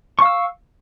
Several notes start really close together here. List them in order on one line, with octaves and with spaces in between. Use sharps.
C#6 F5 E6